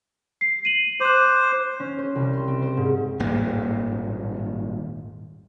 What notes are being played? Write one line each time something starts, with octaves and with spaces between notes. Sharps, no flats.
C7
D#7 F#7
C5 D6 F#6
C#4
C5
C2
C6
C4
C5
G#2
D#1 G#1 A2 A#3